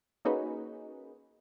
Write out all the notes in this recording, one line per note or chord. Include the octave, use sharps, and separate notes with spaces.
A#3 C#4 D#4 F#4 G#4 B4